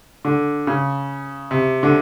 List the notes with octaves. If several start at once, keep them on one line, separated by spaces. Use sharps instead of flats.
D3
C#3
C3
D3